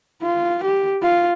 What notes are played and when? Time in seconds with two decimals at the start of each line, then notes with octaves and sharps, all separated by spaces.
0.22 F4
0.64 G4
1.03 F4